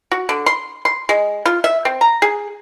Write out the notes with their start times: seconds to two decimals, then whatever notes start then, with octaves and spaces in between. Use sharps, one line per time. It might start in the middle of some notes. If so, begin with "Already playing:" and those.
0.11 F#4
0.29 D3
0.46 C6
0.85 C6
1.09 G#3
1.46 F4
1.64 E5
1.85 C4
2.01 A#5
2.22 G#4